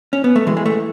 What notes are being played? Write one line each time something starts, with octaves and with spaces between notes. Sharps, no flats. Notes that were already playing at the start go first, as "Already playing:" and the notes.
C#4
B3
A3
E3 G#3
G#3
A3